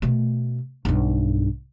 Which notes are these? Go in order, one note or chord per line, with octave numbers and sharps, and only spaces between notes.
B2 A3
B1 G2